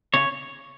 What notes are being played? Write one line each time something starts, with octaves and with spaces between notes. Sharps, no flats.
C#3 C#5